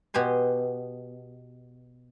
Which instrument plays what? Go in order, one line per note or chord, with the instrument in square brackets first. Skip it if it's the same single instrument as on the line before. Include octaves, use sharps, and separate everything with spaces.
[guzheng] B2 G4 G#5 C6